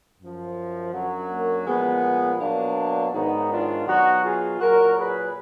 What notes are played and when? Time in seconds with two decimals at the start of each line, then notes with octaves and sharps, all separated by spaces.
0.19 F#2 F3
0.92 F#2 D3 F#3
1.29 A#3
1.66 A#2 F3 G#3 B3
2.39 B2 F#3 A#3 D4
3.13 G#2 D#3 F#3 B3 D#4
3.49 D4 F4
3.86 B2 F#3 D#4 F#4
4.23 F4 G#4
4.59 A#2 F#3 F#4 A#4
4.96 G#4 B4